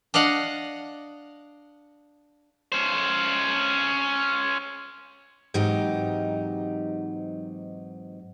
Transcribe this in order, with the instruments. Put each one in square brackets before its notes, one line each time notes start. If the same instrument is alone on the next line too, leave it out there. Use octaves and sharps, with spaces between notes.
[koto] D4 D#5 F5 F#5
[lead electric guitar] C#4 C5
[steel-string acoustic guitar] G#2 E3 F#3 C4 D#4 G4